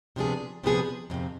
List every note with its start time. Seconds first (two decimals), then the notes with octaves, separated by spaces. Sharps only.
0.16 C3 F3 B3 D4 G#4
0.64 C3 F3 B3 D4 G#4
1.10 F2 C3 D#3